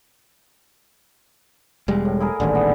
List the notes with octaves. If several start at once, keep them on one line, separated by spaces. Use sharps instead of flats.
E1 G3 G#3
A2
E4 G#4 A#4
D#1 A1 D#2 D3
B3